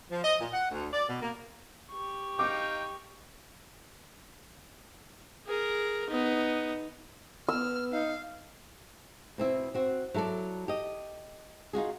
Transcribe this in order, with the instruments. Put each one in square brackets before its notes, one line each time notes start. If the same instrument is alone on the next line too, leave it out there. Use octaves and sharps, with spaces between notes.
[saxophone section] F3
D#5
A#2
F#5
D2
D5
B2
A#3
[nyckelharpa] G4 C#6
[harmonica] D#4 F5 G5 [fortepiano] D6
[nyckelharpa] G#4 A#4
B3 D#4
[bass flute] B3 [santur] E6 [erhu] F6
[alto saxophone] D#4 [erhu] F5
[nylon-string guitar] B2 C4 E4
C4 F#4
F#3 E4 A4 C5 D5
G4 D#5
D#4 F4 F#4 G#4